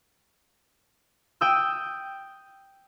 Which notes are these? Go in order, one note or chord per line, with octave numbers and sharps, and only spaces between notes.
G5 D#6 E6 F#6